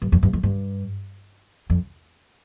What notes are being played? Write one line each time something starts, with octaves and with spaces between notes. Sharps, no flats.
G2
F2
G2
F2
G2
F2